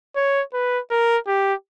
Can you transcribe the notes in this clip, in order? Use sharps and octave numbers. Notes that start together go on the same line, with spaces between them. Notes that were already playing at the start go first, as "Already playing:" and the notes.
C#5
B4
A#4
G4